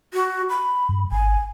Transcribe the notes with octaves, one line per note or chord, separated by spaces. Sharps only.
F#4
B5
G2
G#1 G#5